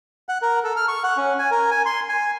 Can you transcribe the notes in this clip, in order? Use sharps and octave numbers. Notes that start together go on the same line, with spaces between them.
F#5
A#4
A4
F6
C#6
F#5
C#4
G#5
A#4
G#5
C6
G#5